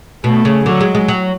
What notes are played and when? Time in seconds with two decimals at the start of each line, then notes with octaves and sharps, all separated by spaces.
0.24 B2 A3
0.45 C#3
0.66 D3 F#3
0.81 G#3
0.95 G#3
1.08 F#3